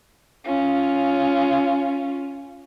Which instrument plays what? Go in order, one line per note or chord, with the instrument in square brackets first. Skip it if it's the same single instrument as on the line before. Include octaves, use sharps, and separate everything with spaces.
[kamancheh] C#4 F4